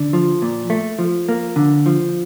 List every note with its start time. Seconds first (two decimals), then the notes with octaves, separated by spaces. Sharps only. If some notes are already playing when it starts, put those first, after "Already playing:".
Already playing: D3
0.13 F3
0.42 A#2
0.70 A3
0.99 F3
1.29 A#3
1.56 D3
1.86 F3